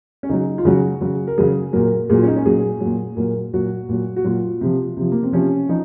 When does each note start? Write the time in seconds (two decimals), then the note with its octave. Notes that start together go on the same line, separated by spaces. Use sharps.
0.23 C#4
0.29 C#3 F#3 D#4
0.58 F4
0.65 C#3 F#3 F#4
1.01 C#3 F#3
1.27 A#4
1.38 C#3 F#3 G#4
1.73 A#2 F#3 A#4
2.09 A#2 F#3 G#4
2.18 F4
2.23 C#4
2.27 D#4
2.36 C#4
2.45 A#2 F#3 G#4
2.81 A#2 F#3
3.17 A#2 F#3 A#4
3.53 A#2 F#3 F#4
3.89 A#2 F#3
4.16 F#4
4.24 A#2 F#3 F4
4.61 C3 F3
4.97 C3 F3
5.12 A#3
5.23 C4
5.32 C3 F3 C#4
5.69 F3 D#4